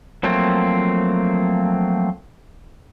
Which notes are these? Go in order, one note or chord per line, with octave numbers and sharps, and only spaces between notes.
F3 F#3 A3 A#3 C4